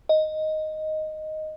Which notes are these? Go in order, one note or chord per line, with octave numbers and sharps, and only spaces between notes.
D#5